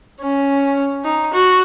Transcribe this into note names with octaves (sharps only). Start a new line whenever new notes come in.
C#4
D#4
F#4